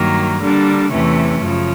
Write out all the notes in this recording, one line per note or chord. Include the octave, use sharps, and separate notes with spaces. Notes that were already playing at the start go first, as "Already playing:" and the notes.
Already playing: G2 D#3 F#3 A#3
D3 G3 A#3 D4
E2 C3 E3 A3 C#4
F#2 C#3 F3